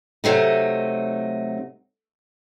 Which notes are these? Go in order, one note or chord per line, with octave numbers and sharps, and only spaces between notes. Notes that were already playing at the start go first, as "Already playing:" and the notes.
C3 F#3 A3 D#4